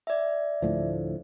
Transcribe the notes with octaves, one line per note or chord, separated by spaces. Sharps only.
D5 E5
D2 A2 F3